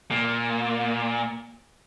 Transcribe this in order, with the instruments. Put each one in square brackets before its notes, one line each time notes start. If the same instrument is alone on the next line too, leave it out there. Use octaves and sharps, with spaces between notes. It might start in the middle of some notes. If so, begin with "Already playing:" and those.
[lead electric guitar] A#2